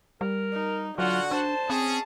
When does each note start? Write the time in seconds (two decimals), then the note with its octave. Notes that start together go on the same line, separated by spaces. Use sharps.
0.21 G3 A#4
0.53 D#4
0.99 D3 F#3 F4 F#4 F#5
1.31 D4 C5 A5
1.70 C4 C#4 G#4